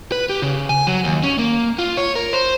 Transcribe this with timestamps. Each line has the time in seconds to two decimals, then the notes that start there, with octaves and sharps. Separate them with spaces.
0.12 B4
0.29 G4
0.42 C#3
0.69 G#5
0.87 F#3
1.04 D#2
1.23 C#4
1.39 A#3
1.79 F4
1.97 C#5
2.16 A#4
2.33 C5